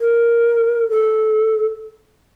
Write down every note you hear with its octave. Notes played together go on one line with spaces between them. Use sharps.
A#4
A4